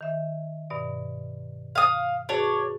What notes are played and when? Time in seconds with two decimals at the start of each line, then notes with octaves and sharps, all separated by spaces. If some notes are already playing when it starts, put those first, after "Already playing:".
0.01 D#3 E5
0.70 G2 B2 D5
1.75 F5 D#6
2.29 D4 F#4 G#4 B4 C#5